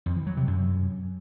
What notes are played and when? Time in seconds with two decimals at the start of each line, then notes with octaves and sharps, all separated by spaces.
0.06 F2
0.16 E3
0.27 F#3
0.37 C3
0.47 F#2